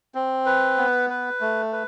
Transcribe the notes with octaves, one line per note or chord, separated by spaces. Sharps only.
C4
B4
B3
B4
A3
B4